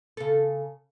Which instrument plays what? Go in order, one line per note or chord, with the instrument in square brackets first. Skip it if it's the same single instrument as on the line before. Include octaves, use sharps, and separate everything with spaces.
[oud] C#3 A4